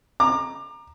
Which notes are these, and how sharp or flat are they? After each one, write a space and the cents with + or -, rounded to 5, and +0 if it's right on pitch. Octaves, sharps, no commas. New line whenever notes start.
A#5 +0 D6 +30